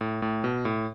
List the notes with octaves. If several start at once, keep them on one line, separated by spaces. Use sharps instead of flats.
A2
A2
B2
A2